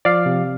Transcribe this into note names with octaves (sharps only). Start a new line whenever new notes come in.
F3 D5 F5
C3